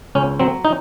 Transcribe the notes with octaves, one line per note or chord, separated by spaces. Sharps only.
C#2 C#4
F#3 C4
D#4